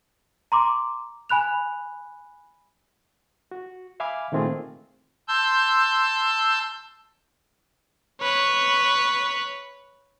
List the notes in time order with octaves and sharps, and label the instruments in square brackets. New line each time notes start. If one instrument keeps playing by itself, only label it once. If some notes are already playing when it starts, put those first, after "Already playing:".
[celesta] A#5 C6 D6
G#5 B5 F#6 F7
[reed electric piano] F#4
E5 F5 G#5 B5 D6 F6
A#2 D#3 A3 C4 F4 G#4
[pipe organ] A5 C6 E6 G6
[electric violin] B4 C#5